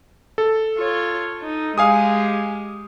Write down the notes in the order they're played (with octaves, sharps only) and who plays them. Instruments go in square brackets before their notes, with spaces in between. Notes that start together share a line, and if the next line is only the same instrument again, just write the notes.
[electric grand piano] A4
[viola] F4 C#5
D#4
[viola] G#3 G4 [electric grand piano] F5 G#5 D#6